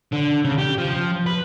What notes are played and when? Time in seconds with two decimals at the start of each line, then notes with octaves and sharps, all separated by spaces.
0.12 D3
0.45 C#3
0.58 G4
0.78 F3
1.26 B4